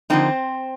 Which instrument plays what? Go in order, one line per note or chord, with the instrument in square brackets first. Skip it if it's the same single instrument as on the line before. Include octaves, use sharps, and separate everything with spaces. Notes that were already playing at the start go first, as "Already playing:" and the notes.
[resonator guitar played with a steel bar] D3 F3 A#3 C4 D#4 C5